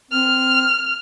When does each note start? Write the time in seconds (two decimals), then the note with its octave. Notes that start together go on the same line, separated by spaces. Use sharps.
0.11 C4 F6